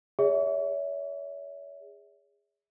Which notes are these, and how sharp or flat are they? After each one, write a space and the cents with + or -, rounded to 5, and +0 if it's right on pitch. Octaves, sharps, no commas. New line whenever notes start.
G#4 -20 C#5 +35 E5 -25